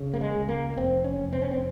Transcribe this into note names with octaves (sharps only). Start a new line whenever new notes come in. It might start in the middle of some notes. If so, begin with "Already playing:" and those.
Already playing: C#3
A#3
G#3
C#2
A#3
F1 C4
C#4
F1
C4
C#4
C4